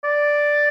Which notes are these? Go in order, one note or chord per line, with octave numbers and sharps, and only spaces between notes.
D5